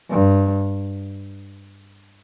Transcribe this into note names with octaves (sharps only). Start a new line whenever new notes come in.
G2